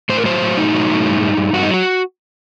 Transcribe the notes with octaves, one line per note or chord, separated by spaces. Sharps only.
A2 C5
A#4
F#3 C5
A2
A2 D#4
F#3
A2
G2
G2
G2
G2 F#4
D#4
F#3 F#4